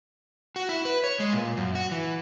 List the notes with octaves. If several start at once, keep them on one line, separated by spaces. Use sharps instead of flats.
F#4
E4
B4
C#5
G#3
A#2
F#2
F#4
E3